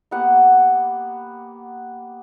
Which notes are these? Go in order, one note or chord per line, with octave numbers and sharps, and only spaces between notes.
A#3 B3 G4 F#5